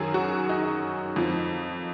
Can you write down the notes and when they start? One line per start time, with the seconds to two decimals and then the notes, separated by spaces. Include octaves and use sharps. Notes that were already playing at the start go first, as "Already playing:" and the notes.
Already playing: F#2 D#3 F#3 G#4
0.14 F#4
0.49 D#4
1.16 F2 F3